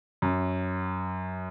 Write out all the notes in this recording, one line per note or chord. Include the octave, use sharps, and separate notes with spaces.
F#2